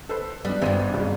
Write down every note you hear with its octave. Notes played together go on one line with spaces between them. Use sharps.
A4 B4 C5
G3 B3 D4
G#1 G2 B3 C4 D#7
F#1 C#3